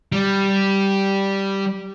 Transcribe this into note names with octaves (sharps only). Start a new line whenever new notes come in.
G3